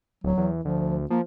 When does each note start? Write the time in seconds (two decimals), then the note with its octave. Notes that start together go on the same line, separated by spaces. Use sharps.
0.24 D1 F#3
0.38 E2
0.65 D2 F3
1.10 F3 A#3